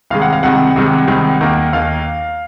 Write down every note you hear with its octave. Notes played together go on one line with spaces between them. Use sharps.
C2 C3 D#3 G#3 F5
F#5
F5
C2 C3 D#3 G#3 F#5
C2 C3 D#3 G#3
C2 C3 D#3 G#3
D#2 D#3 A#3
D#2 D#3 A#3 F5